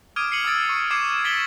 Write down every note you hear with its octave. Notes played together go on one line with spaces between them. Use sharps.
D6 D#6 F6 G#6 D7 D#7
C7 C#7 D#7 F#7
D#6 E6 A6 D7
C#6
D6 G#6 C7 C#7 E7
E6 A6 B6 D7 F#7 G7